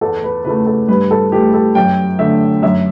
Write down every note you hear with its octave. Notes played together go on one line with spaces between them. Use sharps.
E2 A4
B4
C#3 E3 A3 B4
A4
G2 B4
A4
E3 A3 G4
A4
F#2 G5
D3 A3 E5
F#2 E5